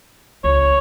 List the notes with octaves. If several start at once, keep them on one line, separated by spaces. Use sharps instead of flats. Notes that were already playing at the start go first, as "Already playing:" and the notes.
C#2 C#5